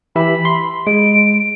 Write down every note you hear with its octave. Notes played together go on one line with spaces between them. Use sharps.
E3 G4 E5 B5
C6
G#3 D7